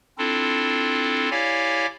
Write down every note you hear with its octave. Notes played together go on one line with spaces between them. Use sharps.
C4 D4 E4 F4 A4
E4 G4 C#5 D5 F5 G#5